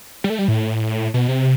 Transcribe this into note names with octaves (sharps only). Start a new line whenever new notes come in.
G3
A3
G3
A2
B2
C3